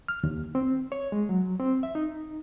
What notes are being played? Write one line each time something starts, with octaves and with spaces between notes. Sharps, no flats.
F6
D#2
C4
C#5
G#3
F#3
C4
E5
D#4